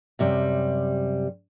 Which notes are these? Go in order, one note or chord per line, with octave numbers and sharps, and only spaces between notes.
F#2 C3 G3